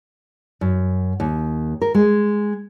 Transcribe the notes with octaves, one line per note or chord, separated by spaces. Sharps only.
F#2
D#2
A#4
G#3